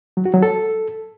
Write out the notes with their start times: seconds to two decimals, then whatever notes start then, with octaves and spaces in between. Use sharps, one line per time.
0.17 F#3
0.25 F#4
0.34 F#3
0.42 A4